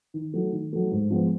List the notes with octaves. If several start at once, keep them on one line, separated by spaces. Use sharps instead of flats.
D#3
F#3 A3
D#3
F#3 A3
G#2
F3 G#3 B3